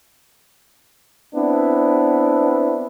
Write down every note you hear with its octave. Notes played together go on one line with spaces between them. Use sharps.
B3 C4 D4 E4